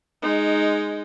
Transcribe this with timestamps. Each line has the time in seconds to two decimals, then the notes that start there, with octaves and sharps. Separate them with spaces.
0.23 G#3 D#4